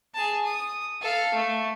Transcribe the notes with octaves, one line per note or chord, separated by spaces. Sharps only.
G#4 A5
D#6
A4 F5
A3